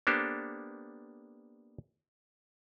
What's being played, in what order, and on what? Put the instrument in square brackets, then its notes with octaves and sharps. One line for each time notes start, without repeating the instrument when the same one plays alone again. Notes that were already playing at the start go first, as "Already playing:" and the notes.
[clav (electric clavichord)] A#3 B3 D4 G4 A4 C5